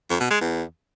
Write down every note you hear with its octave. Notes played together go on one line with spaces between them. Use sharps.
F2
B2
G#3
E2